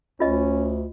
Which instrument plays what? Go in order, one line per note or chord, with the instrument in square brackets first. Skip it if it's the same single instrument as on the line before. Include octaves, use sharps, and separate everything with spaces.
[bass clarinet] D2 [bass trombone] C#4 [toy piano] F4 D#5